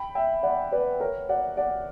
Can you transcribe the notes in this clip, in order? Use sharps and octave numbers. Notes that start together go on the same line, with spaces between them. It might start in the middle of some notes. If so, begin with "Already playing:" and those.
Already playing: G5 B5
E5 G5
D5 F#5
B4 D5
A#4 C#5
D5 F#5
D5 F#5